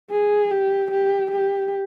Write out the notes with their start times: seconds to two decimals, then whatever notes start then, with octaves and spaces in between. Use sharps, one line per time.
0.11 G#4
0.51 G4
0.91 G4
1.31 G4